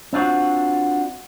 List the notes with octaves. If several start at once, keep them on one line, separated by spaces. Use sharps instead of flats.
C4 D4 F4 F#4